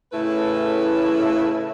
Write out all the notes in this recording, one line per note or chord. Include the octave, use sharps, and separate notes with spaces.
A2 C#3 A3 E4 B4